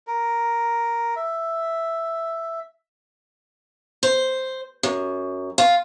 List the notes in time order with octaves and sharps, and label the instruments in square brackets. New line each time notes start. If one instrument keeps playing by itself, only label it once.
[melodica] A#4
E5
[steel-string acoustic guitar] C5
F#2
F4